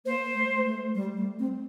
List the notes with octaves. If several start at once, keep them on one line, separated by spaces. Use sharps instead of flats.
A#3 C5
A3
A3
G3
A3
C4